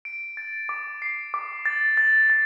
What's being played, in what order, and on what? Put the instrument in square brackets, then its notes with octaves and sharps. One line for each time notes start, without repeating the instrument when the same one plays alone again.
[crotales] D7
A6
D6
C7
D6
A6
A6
A6